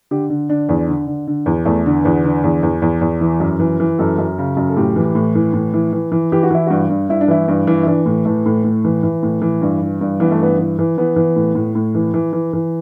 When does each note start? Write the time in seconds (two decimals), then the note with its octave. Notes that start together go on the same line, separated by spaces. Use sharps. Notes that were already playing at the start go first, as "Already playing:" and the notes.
0.11 D3 G4
0.30 D3
0.49 D3 D4
0.69 E2
0.88 D3
1.07 D3
1.27 D3
1.46 E2
1.65 E2 A3
1.86 D3
2.04 E2 B3
2.24 D3
2.44 E2
2.63 E2
2.82 E2
3.01 E2
3.21 E3
3.40 F#2
3.60 E3
3.80 E3
3.98 F#2 A4
4.18 F#2
4.38 C#3
4.57 F#2
4.69 A4
4.77 A2 G4
4.96 E3
5.15 A2
5.35 E3
5.53 A2
5.74 E3
5.93 E3
6.12 E3
6.32 E3 G4
6.43 F#4
6.51 E3 E4
6.67 G2 F#4
6.89 G2
7.09 G2 E4
7.21 D4
7.28 E3 E4
7.48 G2
7.67 E3
7.83 E4
7.87 E3 D4
8.06 A2
8.25 E3 A3
8.46 A2
8.64 A2
8.85 E3
9.03 E3
9.23 A2
9.42 E3
9.62 G2
9.81 E3
10.01 G2
10.20 E3 B3
10.31 A3
10.40 G2 B3
10.59 E3
10.79 E3
10.98 E3 B3
11.16 E3
11.36 A2
11.55 A2
11.75 A2
11.95 E3
12.14 E3
12.33 E3
12.53 E3